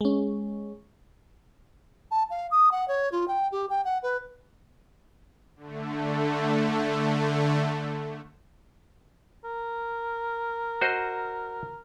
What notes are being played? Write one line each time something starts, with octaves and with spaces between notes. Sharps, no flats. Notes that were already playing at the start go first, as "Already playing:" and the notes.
G#3 C#4
A5
F5
D#6
F#5
C#5
F4
G5
G4
G5
F#5
B4
D3 A3
A#4
F#4 C5 D#5